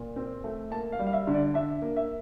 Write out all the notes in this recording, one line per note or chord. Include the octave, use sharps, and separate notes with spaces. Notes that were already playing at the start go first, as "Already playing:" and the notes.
Already playing: A#2
C4
A3
A#3 A5
F5
G3
F5
E5
D3
D5
D4 E5
A#3
E5